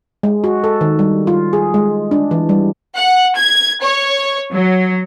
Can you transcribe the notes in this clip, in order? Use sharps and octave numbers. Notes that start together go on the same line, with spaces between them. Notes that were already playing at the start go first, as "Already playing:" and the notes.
G#3
F#4
A4
D#3
G3
F4
G#4
G#3
D4
E3
G3
F#5
G#6
C#5
F#3